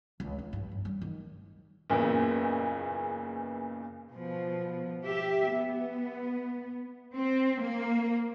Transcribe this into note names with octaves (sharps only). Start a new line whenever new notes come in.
C#2
D4
G2
A1
G3
D#3
F#1 B1 E2 A#2 C#3 E3
B2 F3
G4 E5
B3
C4
A#3